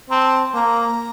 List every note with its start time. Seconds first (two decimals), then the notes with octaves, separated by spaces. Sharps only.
0.10 C4 A#5
0.14 A5
0.54 A#3 A#5